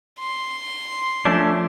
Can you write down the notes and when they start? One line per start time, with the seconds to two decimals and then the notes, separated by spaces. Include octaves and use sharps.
0.19 C6
1.25 F3 A3 C#4 D4